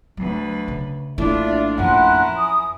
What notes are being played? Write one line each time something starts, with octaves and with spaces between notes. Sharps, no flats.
D2 F#3 B4
C#3
A#1 A2 D4 E4 F4 D5 E5
F#2 F3 C#4 E4 A#4 F#5 C6 F#6
G#5 D#6